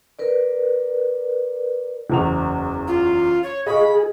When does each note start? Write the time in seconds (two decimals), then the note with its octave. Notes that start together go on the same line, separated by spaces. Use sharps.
0.19 A#4 B4 D5
2.10 F#1 E2 F7
2.87 F4
3.43 C#5
3.66 G#4 D#5 F5 B5 C#6